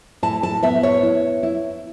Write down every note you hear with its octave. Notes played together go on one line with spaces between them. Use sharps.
A2 A5
A5
B3 E5
C#5
E4
E4